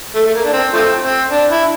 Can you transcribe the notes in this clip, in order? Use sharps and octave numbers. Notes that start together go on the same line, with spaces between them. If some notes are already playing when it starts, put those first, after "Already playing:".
A3
A3
A#3
D4
C4
F3 A3 C4
C4
D4
E4